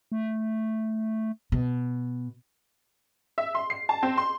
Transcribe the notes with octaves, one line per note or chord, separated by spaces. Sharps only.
A3
B2
E5
C6
C7
A5
C4
C6